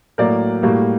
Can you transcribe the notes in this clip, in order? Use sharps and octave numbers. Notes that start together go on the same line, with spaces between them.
A2 F#3 A#3 A#4 D5
A2 G3 A#3 F#4